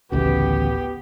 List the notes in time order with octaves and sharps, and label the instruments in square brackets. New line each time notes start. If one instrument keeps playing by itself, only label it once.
[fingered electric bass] A1 D2 C#3 [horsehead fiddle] B3 G4